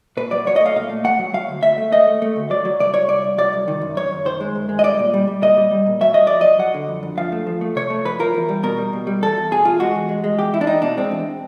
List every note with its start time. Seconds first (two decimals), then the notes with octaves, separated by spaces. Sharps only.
0.17 A#2 B4
0.31 F#3 D5
0.47 F#3 C#5
0.56 D#5
0.61 A3 F5
0.76 A#2 F5
0.89 A3
1.04 A3 F#5
1.19 F#3
1.34 F#3 F5
1.48 D2
1.63 D2 E5
1.78 A3
1.92 A3 D#5
2.07 A3
2.22 A3
2.36 D2
2.50 F#3 D5
2.65 F#3
2.79 C2 D5
2.94 C2 C#5
3.08 C2 D5
3.24 C2
3.38 F#3 D5
3.53 C2
3.68 D#3
3.81 F#2
3.97 F#2 C#5
4.11 F#2
4.25 D#3 C5
4.40 G#3
4.55 F#2
4.69 G#3
4.79 D#5
4.84 G3 D5
4.99 A#2
5.14 G3
5.28 G3
5.42 A#2 D#5
5.57 G3
5.71 G3
5.86 A#2
6.01 F#3 E5
6.14 F#3 D#5
6.27 F2 D5
6.41 F#3 D#5
6.59 F#3 F#5
6.74 D3
6.88 F2
7.03 F2
7.17 F3 F5
7.32 A3
7.47 F3
7.61 A3
7.76 C3 C#5
7.90 A3
8.05 F2 B4
8.19 F3 A#4
8.34 E2
8.49 G3
8.63 B2 A#4
8.78 G3
8.93 B2
9.07 G3
9.22 E2 A4
9.37 E2
9.51 B2 G#4
9.65 E2 F4
9.80 G#3 F#4
9.95 E2
10.09 G#3
10.24 G#3
10.39 E2 G4
10.53 E2 E4
10.61 D4
10.67 E2 D#4
10.82 B2 D4
10.97 G#3 C4
11.11 E2